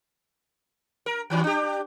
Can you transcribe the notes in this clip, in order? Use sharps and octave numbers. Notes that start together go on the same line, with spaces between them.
A#4
G2 D#3 F#3
D4 G4